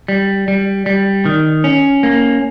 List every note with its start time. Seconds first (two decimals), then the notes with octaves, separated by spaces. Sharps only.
0.08 G3
0.48 G3
0.86 G3
1.25 D#3
1.64 C#4
2.03 A#3